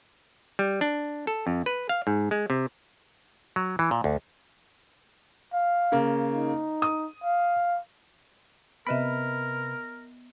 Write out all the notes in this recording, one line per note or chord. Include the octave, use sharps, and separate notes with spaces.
G3
D4
A4
F2
B4
F5
G#2
G#3
C3
F#3
E3
A#2
D2
F5
C#3 A#3
D#4
D#6
F5
C3 B3 A#4 B4 D#5 E5 B5